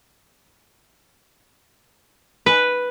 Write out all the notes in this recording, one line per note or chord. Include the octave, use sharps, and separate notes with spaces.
B4